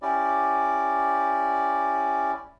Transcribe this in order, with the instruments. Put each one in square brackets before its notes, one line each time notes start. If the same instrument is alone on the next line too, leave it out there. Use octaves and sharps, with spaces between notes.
[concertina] C#4 E4 G4 D5